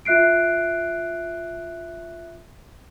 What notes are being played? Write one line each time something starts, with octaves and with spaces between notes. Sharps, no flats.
F4 E5 F#6 C7 D7